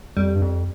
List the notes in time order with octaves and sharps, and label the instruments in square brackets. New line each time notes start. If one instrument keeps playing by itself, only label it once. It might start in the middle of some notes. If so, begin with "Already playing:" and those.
[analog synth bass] F2 [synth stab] G3
[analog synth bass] G2
F2